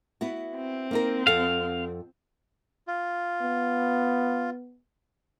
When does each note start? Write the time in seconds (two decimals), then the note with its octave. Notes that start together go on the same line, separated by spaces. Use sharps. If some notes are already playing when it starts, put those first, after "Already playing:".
0.21 B3 E4 F#4
0.56 C4
0.91 A#3 D#4 A#4
1.27 F2 A4 F5 F#5
2.87 F4
3.41 B3